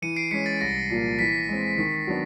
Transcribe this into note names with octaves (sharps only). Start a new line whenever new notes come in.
E3 C#7 D#7
C7 D7
G#3 C#4 B6 C#7
A6
C2 A#6
A#2 F3 A#3
E3 B6
G#3 C4
D#3
F#3 B3 D4